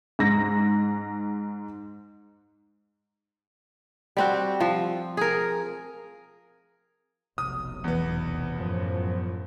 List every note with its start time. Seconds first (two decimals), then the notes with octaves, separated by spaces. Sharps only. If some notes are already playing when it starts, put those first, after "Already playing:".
0.19 G#2 A#6
4.17 G3 C4 F#4
4.60 F3
5.17 G#4 A#4
7.38 F1 B1 D#6
7.84 E2 B3
8.54 F#2 A2 F3